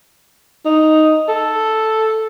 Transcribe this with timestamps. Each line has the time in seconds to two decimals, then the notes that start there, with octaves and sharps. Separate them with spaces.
0.65 D#4
1.28 A4